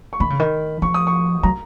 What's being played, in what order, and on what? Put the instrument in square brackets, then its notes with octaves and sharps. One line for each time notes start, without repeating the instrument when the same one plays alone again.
[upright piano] C#6
[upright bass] D#3 [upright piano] B5
[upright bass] C#3
D#3
[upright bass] F3 [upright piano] C#6
[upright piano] D#6
C#6
[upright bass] F#3 [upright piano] A#5